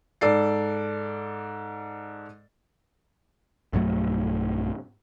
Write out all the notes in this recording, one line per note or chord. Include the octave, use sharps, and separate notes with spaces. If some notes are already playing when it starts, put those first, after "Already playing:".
G#2 A4 D5 C7
B1 G2 F#3 A3